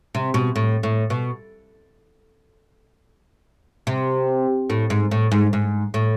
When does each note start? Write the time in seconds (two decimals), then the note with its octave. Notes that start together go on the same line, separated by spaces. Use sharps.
0.15 C3
0.34 B2
0.56 A2
0.83 A2
1.10 B2
3.87 C3
4.70 A2
4.90 G#2
5.11 A2
5.32 G#2
5.53 G#2
5.94 A2